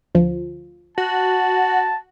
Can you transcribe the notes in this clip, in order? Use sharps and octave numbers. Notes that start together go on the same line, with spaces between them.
D2 F3
F#4 A5